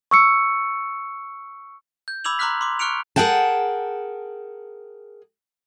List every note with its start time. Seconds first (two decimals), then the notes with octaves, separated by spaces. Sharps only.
0.11 C#6 E6 C#7
2.08 G6
2.24 B5 D6 E6 G#6 F7 F#7
2.39 A#5 C6 D6 F6 F#6 B6
2.61 C6 D6
2.79 C#6 F6 F#6 C#7 D7 F7
3.16 G#4 A#4 F#5 G5 A5